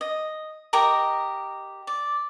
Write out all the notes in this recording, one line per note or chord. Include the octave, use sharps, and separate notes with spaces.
D#5
G4 A#4 D#5 A#5
D5